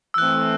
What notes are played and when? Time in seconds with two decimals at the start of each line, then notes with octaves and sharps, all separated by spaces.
0.14 E6
0.18 E3 A3 C4 F#6